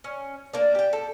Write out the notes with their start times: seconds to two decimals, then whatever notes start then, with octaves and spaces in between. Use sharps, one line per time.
0.04 C#4
0.53 A#3 D4
0.75 G4 G5
0.93 A4